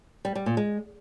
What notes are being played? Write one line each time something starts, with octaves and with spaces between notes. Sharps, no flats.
G3
G3
A#2
G#3